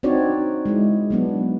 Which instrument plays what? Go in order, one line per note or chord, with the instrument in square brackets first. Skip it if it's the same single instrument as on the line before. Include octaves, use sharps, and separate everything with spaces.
[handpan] C4 D4 D#4 F#4 C#5 D5
G#3 E4
F#3 B3 D4